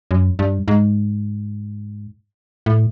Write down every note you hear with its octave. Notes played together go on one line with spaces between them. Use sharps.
F#2
G2
G#2
A2